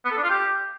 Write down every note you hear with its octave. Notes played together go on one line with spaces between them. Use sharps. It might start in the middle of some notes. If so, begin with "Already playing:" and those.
B3
A4
D4
F4
G4